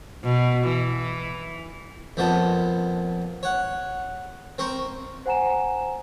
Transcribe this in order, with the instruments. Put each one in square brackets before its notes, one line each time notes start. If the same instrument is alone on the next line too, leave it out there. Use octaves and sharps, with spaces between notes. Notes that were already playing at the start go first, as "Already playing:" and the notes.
[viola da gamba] B2
E3
[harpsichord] F2 A#2 B3 D#5 A5
C#5 F#5
C4 A#4 C#6
[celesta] C5 F#5 G#5 A#5 E7